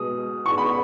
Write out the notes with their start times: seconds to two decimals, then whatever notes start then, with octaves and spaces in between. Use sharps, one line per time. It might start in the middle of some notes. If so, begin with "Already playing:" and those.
Already playing: B2 G#3 D#6
0.46 C#6
0.58 B5